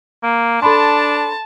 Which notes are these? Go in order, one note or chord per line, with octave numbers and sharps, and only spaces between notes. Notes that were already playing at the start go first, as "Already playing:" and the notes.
A#3
D4 A4 A5 B5 C6